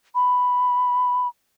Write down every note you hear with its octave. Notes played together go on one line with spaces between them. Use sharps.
B5